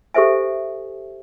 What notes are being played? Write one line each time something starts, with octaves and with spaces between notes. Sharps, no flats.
G4 A4 C5 E5 G#5